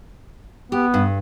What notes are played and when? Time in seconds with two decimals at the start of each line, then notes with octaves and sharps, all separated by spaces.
0.72 B3 G4
0.94 G2